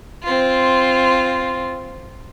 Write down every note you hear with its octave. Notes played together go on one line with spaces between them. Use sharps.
C4 F4